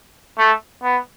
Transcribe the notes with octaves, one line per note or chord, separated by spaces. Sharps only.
A3
B3